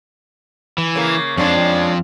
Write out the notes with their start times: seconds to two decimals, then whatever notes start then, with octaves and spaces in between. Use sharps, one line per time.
0.78 E3
0.95 C#3 A#3
1.37 F2 F3 G#3 C#4 D4